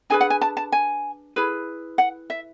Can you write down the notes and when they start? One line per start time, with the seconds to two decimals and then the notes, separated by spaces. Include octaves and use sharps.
0.10 D4 G#4 B4 G#5
0.21 F#5
0.30 G#5
0.41 A5
0.57 A5
0.72 G#5
1.36 E4 G#4 B4
1.98 F#5
2.30 E5